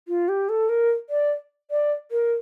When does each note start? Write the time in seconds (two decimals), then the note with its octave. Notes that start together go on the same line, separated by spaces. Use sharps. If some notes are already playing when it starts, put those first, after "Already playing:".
0.08 F4
0.29 G4
0.49 A4
0.69 A#4
1.10 D5
1.71 D5
2.11 A#4